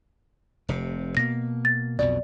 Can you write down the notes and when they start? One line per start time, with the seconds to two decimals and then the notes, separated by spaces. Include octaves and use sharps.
0.68 F1 C3
1.17 B2 A#3 A#6
1.65 A6
1.99 B1 F2 B2 D5